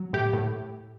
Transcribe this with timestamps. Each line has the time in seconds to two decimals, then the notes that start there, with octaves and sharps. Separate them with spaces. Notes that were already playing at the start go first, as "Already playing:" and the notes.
Already playing: F#3
0.13 A2 G4
0.33 A2